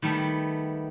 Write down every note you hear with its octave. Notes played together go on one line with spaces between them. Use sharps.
D#3 G3 A3 B3